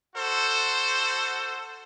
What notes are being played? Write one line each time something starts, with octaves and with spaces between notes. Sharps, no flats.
F#4 A4 C5